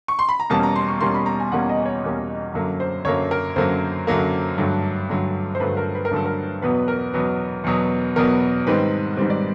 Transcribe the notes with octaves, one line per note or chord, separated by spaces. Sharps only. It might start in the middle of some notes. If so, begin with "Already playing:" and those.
C#6
C6
B5
A#5
E2 B2 G3 A#3 C#4 A5
A#5
C6
C#6
E2 B2 G3 A#3 C#4 C6
B5
A#5
G#5
E2 B2 G3 A#3 C#4 F#5
D#5
C#5
E2 B2 G3 A#3 C#4
F#2 D3 F#3 A#3
C5
F#2 D3 F#3 A#3 C#5
A#4
F#2 D3 F#3 A#3 C5
F#2 D3 F#3 A#3
G2 D3 F#3 A3
G2 D3 F#3 A3
C5
G2 D3 F#3 A3 B4
A#4
B4
A#4
G2 D3 F#3 A3 A4
A#4
E2 B2 F#3 B3 B4
A#4
E2 B2 F#3 B3
E2 B2 F#3 B3
E2 B2 F#3 B3 A#4
G#2 D#3 G3 C4 B4
G#2 D#3 G3 C4
D5